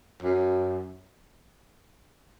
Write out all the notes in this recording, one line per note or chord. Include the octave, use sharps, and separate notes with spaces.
F#2